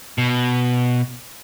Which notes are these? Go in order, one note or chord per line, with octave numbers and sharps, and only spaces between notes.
B2